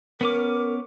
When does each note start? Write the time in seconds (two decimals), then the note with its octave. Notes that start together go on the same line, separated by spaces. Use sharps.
0.21 B3 C#4 A#4 D6